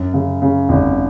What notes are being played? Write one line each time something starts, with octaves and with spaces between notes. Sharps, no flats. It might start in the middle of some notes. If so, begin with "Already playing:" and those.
Already playing: F#2
C#3
C#3
G#1